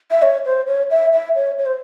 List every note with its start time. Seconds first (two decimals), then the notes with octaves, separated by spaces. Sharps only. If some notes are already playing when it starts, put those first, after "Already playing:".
0.11 E5
0.22 C#5
0.46 C5
0.67 C#5
0.90 E5
1.13 E5
1.35 C#5
1.58 C#5
1.66 C5